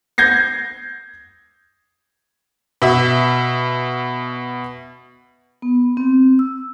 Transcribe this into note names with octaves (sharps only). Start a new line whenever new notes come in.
G6 G#6 A#6 C7
B2 E5
B3
C4
E6